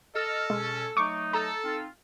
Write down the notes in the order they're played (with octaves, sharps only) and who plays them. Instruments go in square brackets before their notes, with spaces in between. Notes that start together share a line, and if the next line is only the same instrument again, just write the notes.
[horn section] A4 [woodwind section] D#5 F6
[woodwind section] B2 C#4 [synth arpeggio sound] G#3
[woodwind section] F#3 A3 D#4 [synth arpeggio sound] C#6 D6
[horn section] A4 [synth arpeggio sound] A#5
[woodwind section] C4 D#4 F4